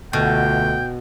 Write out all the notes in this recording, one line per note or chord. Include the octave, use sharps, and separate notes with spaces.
C#2 B2 D3 A3 G5